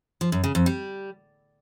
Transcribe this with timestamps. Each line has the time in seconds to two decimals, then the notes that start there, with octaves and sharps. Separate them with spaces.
0.21 F3
0.32 F#2
0.44 C#3
0.55 F2
0.66 G3